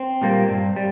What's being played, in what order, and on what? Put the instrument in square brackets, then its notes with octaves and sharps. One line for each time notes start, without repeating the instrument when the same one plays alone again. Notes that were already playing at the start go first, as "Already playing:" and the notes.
Already playing: [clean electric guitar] C4
A#2 G3 A#3
G2
G3